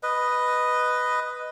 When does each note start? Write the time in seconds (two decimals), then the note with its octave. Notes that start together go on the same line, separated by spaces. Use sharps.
0.03 B4 D#5